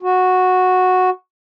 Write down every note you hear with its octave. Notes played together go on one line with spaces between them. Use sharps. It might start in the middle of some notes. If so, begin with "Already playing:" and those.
F#4